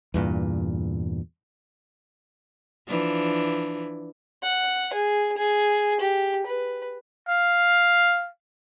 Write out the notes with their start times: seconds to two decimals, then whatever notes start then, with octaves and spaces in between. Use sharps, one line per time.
0.14 E2 G2 A#2
2.87 E3 F3 D4
4.44 F#5
4.93 G#4
5.37 G#4
6.00 G4
6.46 B4
7.29 F5